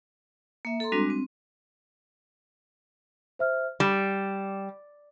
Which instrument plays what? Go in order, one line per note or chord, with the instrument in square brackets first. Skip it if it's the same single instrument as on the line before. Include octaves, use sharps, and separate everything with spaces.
[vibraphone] A#3 E5
A4 A#5 C6
G3 G#3 C4 D4 F#4
C4
[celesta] C5 E5 F6
[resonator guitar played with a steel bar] G3 [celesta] E7